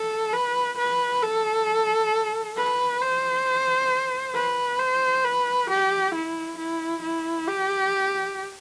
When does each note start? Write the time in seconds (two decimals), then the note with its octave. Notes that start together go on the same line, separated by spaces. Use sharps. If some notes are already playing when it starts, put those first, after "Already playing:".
Already playing: A4
0.33 B4
0.78 B4
1.22 A4
2.57 B4
3.01 C5
4.35 B4
4.79 C5
5.25 B4
5.70 G4
6.14 E4
6.58 E4
7.02 E4
7.48 G4